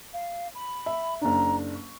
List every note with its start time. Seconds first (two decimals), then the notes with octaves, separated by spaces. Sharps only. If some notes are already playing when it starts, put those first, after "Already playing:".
0.13 F5
0.55 B5
0.86 E5
1.21 F#1 D4 A#5
1.75 C#6